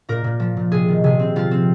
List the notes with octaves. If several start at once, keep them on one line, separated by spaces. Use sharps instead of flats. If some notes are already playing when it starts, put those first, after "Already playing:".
A#2 A#4
A#2
F3
A#2
C3 G#4
D#3
C3 G#4
C4
F3 F4
C4